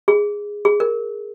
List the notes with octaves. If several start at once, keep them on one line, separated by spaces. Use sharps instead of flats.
G#4
G#4
A#4